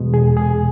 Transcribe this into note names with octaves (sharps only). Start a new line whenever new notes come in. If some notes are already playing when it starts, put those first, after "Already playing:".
Already playing: E2 B2 G#3
G#4
G#4